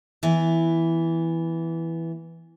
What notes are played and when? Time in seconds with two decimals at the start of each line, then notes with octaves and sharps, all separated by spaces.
0.23 E3 B3